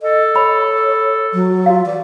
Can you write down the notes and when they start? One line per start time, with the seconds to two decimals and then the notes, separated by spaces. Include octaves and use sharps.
0.01 A4 D#5
0.36 C#5 B5
1.33 F#3
1.66 F4 F#4 F5
1.86 E3 D5